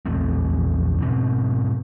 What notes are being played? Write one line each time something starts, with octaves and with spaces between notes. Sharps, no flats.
A#1 E2 A3 C4
G#2 B2 C4